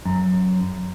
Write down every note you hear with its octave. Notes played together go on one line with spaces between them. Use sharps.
F#2